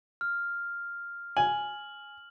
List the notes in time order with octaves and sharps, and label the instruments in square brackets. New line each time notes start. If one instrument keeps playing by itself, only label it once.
[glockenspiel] F6
[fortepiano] G#5 [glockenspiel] F#7